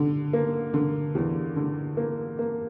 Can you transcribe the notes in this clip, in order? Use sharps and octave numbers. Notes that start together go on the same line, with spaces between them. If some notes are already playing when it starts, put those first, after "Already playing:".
Already playing: D3
A#3
D3
E2
D3
A#3
A#3